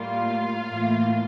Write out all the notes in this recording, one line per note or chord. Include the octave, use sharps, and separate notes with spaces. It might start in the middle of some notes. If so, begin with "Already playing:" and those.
Already playing: A2 G3 A#3 F4 F5
A2 E3 A#3